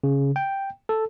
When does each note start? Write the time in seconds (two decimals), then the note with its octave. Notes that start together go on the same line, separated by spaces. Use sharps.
0.04 C#3
0.36 G5
0.89 A4